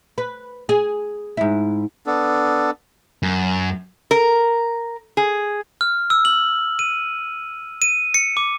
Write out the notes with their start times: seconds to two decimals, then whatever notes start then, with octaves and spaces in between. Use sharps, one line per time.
0.18 B4
0.69 G#4
1.37 G#2 E4
2.07 B3 D4 A4
3.23 F#2
4.11 A#4
5.17 G#4
5.81 F6
6.10 E6
6.25 F#7
6.79 D#7
7.82 D#7
8.14 C#7
8.37 D6